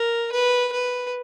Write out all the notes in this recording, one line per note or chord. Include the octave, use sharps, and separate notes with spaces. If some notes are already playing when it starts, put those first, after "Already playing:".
Already playing: A#4
B4
B4